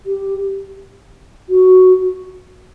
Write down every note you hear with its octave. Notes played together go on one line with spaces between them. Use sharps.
G4
F#4